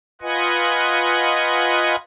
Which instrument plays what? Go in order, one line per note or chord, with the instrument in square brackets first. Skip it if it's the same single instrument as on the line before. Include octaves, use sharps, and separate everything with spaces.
[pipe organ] F4 B4 D#5 F#5 G#5